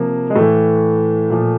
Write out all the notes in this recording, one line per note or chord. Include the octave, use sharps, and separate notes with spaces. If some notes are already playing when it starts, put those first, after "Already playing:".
Already playing: C3 F3 A#3
G#3
A2 E3 A3
A#2 F3